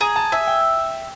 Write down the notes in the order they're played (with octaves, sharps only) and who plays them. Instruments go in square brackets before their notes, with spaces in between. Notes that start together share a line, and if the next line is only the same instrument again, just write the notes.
[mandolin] G#4 [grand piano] A#5
[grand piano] A5
[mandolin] E5 [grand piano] G#5
[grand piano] G5